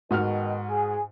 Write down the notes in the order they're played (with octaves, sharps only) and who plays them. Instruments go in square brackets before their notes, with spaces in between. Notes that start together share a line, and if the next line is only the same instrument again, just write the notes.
[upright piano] G#2 F#4 F6 [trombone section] B2 D#3
[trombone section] G#4